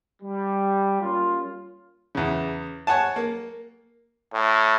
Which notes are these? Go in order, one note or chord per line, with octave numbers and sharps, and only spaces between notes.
G3
G3 A#3 C#4 F4
E2 C#3
C#5 F#5 G#5 A5
A#3
A2